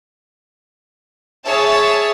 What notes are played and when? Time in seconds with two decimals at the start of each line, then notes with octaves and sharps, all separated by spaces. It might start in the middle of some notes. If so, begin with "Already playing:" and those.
1.46 G#4 C#5 E5 A5